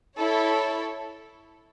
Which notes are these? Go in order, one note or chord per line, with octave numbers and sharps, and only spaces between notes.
E4 A4 C#5